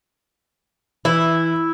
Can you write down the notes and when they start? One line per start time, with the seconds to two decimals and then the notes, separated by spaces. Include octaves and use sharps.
1.05 E3 E4